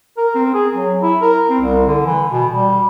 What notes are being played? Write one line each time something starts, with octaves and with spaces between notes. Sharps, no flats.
A#4
C4
G#4
F#3
E4
A#4
C4
C2
D3
E3
B2
G3